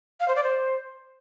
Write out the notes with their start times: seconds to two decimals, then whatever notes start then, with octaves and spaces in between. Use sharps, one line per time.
0.20 F5
0.28 C5
0.36 D5
0.44 C5